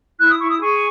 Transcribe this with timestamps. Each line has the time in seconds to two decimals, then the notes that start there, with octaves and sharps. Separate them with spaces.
0.19 E4 F#6
0.29 D#6
0.39 E4 C#6
0.49 D#6
0.60 G#4 C#6